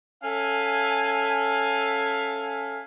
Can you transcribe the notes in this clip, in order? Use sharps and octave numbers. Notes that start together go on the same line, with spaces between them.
C#4 A4 E5 F5 G#5